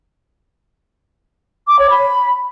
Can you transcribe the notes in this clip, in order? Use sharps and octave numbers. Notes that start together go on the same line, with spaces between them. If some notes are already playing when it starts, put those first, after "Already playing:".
D6
C#5
B5